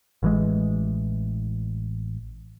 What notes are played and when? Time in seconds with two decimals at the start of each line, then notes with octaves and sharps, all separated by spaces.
0.23 A1 E3 G#3